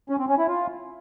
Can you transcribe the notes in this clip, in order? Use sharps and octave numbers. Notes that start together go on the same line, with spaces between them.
C#4
C4
C#4
E4
F4